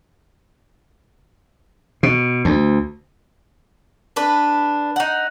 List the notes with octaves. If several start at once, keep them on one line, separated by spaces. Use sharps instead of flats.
B2
D2
D4 B4
D#4 F#5